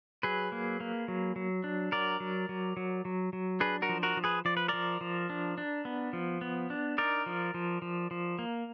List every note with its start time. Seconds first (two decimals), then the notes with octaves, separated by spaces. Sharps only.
0.23 F#3 G#4 B4
0.52 A#3
0.80 A#3
1.08 F#3
1.36 F#3
1.64 D4
1.92 F#3 A#4 D5
2.20 F#3
2.49 F#3
2.77 F#3
3.05 F#3
3.33 F#3
3.60 D4 G#4 B4
3.82 F#4 A#4
3.89 F3
4.03 F#4 A#4
4.17 F3
4.24 G#4 B4
4.45 F3 D5
4.57 B4
4.68 F3 A#4 D5
5.01 F3
5.30 D4
5.58 D4
5.85 B3
6.13 F3
6.41 B3
6.70 D4
6.98 D#4 A#4 D5
7.26 F3
7.54 F3
7.82 F3
8.11 F3
8.39 A#3